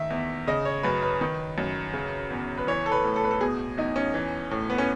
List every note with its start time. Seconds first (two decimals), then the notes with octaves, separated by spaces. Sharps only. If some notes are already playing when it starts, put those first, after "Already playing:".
Already playing: D#3 E5
0.10 E2
0.47 C#3 D#5
0.65 C#5
0.83 F#2 B4
1.03 B4
1.21 D#3
1.58 F#2
1.94 C#3
2.30 E2
2.58 B4
2.67 E3 C#5
2.86 A4
2.92 B4
3.04 A2
3.16 A4
3.24 B4
3.31 A4
3.40 B2 G#4
3.77 E2 D#4
3.96 C#4
4.14 E3
4.51 A2
4.70 B3
4.78 C#4